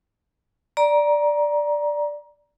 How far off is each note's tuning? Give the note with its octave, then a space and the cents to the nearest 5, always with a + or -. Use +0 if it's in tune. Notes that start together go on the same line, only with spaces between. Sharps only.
D5 +0 A#5 +20